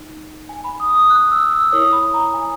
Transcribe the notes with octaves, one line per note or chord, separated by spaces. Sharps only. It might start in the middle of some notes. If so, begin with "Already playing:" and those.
Already playing: D#4
G#5
B5
D#6
D#6
F#6
E6
E6
E4 A#4 C#5 D#6
B5
A#5
G#5